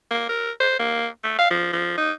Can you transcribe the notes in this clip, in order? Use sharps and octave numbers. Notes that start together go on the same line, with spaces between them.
A#3
A#4
C5
A#3
A3
F5
F3
F3
D#4